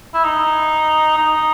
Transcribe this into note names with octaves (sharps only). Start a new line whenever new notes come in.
E4
D#4
D#4